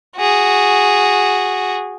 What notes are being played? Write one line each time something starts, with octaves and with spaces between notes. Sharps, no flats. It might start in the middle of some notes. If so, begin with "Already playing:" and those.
F#4 G#4